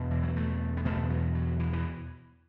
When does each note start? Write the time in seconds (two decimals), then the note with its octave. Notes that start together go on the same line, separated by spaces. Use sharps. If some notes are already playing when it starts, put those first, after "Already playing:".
Already playing: E2 B2
0.11 E3
0.23 F#3
0.36 A3
0.77 B3
0.85 E2 B2 A3
1.10 F#3
1.35 F#3
1.59 E3
1.73 E3